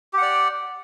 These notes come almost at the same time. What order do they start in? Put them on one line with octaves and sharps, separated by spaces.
G4 F#5 D5